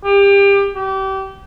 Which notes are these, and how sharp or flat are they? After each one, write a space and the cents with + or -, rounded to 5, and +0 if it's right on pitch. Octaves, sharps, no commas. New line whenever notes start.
G4 +25
G4 -30